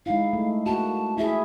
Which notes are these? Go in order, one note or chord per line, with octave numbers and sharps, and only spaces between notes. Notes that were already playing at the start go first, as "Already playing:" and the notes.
G#3 D#4 E4 F5
A3
A#3 F#4 A5
E4 G#4 E5